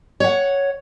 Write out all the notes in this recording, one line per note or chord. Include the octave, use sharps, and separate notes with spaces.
C#5 F#5